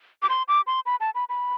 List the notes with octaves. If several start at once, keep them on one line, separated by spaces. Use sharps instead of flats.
D6
C6
D6
C6
B5
A5
B5
B5